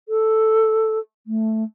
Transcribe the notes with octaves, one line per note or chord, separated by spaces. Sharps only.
A4
A3